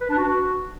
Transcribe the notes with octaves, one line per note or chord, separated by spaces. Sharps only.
B4
D4
F#4